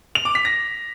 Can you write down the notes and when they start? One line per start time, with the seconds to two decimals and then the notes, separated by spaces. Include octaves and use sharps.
0.15 F7
0.25 D6
0.35 B6
0.45 A#6